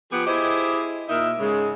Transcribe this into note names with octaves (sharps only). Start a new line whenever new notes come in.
F3 B3 G4 G#4
E4 G4 G#4 C5 D#5
A#2 D#4 A#4 E5
G#2 C#3 G#3